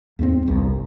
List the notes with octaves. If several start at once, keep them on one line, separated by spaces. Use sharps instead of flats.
E2 G#2 A3 C4
G1 C2 G2